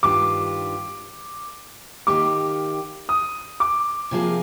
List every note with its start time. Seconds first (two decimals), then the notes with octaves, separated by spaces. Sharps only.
0.03 G2 D#3 G3 D4 F4 D6
2.07 D#3 A#3 D#4 G4 D6
3.09 D#6
3.60 D6
4.11 C3 F3 A#3 F4 G#4